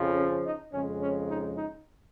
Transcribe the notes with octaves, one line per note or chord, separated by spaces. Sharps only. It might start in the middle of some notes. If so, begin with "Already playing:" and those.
Already playing: F2 C#3 F3
C#4
D#4
F2 C#3 G#3 C#4
C#4
D#4
D#4